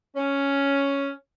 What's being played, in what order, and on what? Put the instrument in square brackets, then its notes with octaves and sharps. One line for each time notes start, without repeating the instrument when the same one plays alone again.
[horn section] C#4